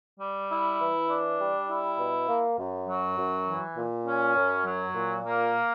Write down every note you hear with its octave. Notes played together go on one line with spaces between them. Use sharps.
G3
E4
E3
D4
G3
E4
B2
A#3
F#2
F#3
F#2
E3
A#2
C#4
F#2
F#3
A#2
A#3